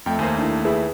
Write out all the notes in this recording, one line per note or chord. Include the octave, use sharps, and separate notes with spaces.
F2 A3 G5
D#2 A#3 C5 G#5
D4 E4
E4 G#4 B4